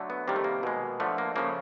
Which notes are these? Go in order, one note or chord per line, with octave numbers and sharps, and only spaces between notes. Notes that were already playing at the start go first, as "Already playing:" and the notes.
Already playing: D3 F#3 A3
B3
C3 D#3 G3 A#3
A3
A#3
B2 G#3
D3 F3 A3
A#3
C#3 F3 A3 A#3